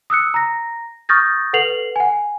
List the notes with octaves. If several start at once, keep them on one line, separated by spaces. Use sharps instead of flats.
D#6 E6 F#6 C#7
A#5 A#6
C#6 D#6 F6 G6 A6 A#6
A4 B4 F#5 C7 F7 F#7
F#5 G#5